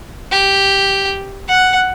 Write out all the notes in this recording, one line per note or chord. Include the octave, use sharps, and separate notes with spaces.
G4
F#5